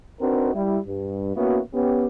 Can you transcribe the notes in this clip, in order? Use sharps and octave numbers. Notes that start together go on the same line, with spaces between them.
C4 D4 D#4 F#4 A#4 B4
G3 E4
G2
A#3 B3 C#4 E4 F#4
B3 C#4 G4